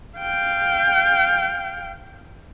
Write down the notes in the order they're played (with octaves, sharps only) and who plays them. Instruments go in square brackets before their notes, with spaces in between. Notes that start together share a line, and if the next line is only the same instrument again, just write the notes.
[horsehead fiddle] F5 G5